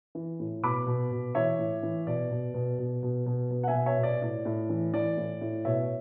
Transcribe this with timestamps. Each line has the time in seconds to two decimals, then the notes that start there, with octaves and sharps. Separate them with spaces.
0.15 E3
0.40 A2
0.63 B2 B5 D6
0.87 B2
1.11 B2
1.35 E3 C#5 E5
1.58 A2
1.83 E3
2.07 B2 D5
2.31 B2
2.54 B2
2.78 B2
3.03 B2
3.26 B2
3.50 B2
3.63 F#5
3.68 E5 G#5
3.74 B2
3.86 C#5 E5
3.98 B2 D5
4.22 A2 D5
4.45 A2
4.69 E3
4.93 E3 D5
5.17 A2
5.41 A2
5.65 B2 C#5 E5